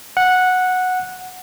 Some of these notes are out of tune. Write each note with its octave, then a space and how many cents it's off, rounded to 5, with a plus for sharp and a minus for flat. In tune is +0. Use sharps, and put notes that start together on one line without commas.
F#5 -10